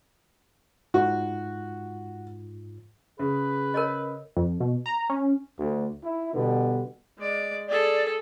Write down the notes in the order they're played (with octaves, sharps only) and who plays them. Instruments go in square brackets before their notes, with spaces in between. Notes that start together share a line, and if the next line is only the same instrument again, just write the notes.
[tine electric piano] G#2 F4 [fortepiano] F#4
[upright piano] C#3 [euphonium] G#4 [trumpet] B4
[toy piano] A#4 C#5 D#5
[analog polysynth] F2
B2
A#5
C#4
[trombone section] D2
E4
B2 D3 G3 B3
[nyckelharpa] G#3 D5
[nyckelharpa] G#4 A4 [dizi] D5